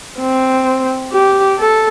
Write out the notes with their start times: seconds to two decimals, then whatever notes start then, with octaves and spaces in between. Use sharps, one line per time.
0.20 C4
1.12 G4
1.59 A4